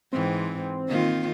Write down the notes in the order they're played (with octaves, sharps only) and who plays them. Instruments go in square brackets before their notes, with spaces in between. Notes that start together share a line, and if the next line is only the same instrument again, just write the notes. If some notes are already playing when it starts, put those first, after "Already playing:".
[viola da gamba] G#2 E3 [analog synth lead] C4
[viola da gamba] D#3 A#3 F4